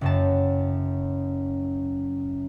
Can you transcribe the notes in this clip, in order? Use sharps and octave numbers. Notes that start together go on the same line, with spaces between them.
F#1 F#2 A5